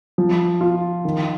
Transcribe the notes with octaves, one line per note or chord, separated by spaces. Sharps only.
F3
F4
D#3